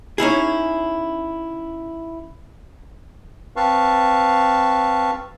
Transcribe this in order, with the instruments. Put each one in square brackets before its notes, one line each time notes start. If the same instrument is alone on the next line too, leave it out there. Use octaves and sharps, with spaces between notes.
[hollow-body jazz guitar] C#4 D#4 E4 G#4
[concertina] C4 B4 F5 A5 C#6